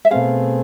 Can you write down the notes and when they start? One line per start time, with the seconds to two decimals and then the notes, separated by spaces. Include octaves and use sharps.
0.05 E5
0.11 B2 A3 C4 G#4 F5